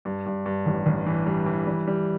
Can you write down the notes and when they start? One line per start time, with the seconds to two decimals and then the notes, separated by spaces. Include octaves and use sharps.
0.05 G2
0.26 G2
0.46 G2
0.66 A1
0.86 A1
1.06 E3
1.26 G3
1.46 E3
1.67 G3
1.88 G3